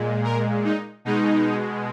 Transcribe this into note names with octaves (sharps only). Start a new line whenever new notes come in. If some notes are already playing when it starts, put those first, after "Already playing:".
Already playing: A#2 G#3
A#4
D#4
B2 G#3 D#4